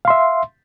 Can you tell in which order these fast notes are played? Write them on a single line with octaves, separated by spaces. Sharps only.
F5 C6 E5